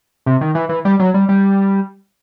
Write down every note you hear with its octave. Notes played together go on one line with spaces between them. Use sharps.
C3
D#3
E3
E3
G3
F#3
G3
G3